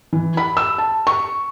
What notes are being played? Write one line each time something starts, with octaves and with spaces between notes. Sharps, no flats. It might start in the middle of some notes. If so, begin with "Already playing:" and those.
E3
B5
E6
A5
C#6